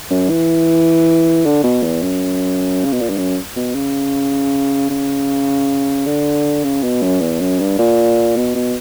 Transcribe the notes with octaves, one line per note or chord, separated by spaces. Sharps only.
F#2
E3
D3
B2
E2
F#2
C#3
B2
A#2
G2
F#2
B2
C#3
C#3
D3
C#3
B2
F#2
E2
F#2
G2
A#2
B2
B2